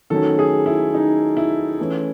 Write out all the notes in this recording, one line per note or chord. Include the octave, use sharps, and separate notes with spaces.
D#3 F#3 A3 C#4 A4
G#4
E4
D#4
E4
E3 A3 C#4